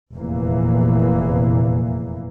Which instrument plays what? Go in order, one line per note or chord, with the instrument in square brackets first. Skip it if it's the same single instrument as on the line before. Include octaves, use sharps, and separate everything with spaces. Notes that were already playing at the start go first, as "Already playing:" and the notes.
[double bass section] F1 E2 A#2 E3 A#3